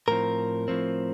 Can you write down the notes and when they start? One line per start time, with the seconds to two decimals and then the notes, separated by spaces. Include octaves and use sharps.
0.08 A2 F3 C4 A#4
0.68 A2 F3 C4